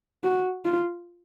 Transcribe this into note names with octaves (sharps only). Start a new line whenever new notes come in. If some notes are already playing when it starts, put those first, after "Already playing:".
F#4
F4